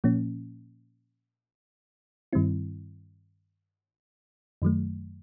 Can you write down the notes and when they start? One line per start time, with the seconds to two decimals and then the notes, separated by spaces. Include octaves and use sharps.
0.04 A#2 F3 A#3 C#4
2.33 G2 D#3 G3 C4 E4
4.62 F#2 D#3 F#3 A3